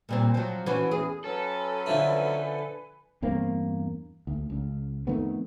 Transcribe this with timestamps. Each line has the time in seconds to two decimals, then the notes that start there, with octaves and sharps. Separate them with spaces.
0.09 A#2 G3 C4
0.34 F3 F#3
0.66 E3 C#4 F#4
0.91 E2 G#4
1.24 F#3 C#4 A4 B4 G#5
1.86 D3 F3 E4
3.22 E2 G2 A#3 C4
4.27 D2
4.50 C#2
5.07 F2 D#3 A3 B3